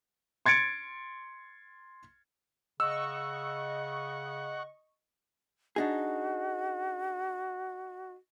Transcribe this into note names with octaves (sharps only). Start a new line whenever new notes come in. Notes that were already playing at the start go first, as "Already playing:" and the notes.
C6 G#6 A6 C#7 D7
C#3 D#5 F#5 C#6 E6
D4 D#4 F#4 G#4